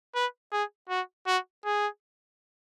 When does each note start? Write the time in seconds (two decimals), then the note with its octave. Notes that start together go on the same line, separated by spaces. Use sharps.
0.15 B4
0.52 G#4
0.89 F#4
1.26 F#4
1.65 G#4